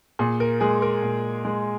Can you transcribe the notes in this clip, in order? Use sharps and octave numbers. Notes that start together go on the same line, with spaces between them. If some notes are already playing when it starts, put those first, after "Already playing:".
A#2 G#4
A#4
G#3 G#4
A#4
A#2
G#3